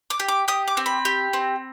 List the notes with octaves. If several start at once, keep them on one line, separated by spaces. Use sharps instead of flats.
D6
G4
D6
G4 D#6
D6
C4
B5
G4
C4